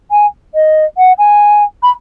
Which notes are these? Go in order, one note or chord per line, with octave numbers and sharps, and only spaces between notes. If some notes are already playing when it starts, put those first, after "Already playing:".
G#5
D#5
F#5
G#5
B5